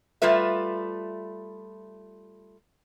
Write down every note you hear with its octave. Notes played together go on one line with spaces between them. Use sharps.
G3 A3 F4 B4 E5